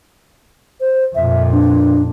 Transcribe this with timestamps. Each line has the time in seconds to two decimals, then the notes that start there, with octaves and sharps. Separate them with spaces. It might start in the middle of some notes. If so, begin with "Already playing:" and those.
0.81 C5
1.15 F2 A#2 E5
1.52 D4